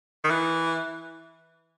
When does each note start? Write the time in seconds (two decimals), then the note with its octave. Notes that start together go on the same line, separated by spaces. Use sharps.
0.24 D#3
0.30 E3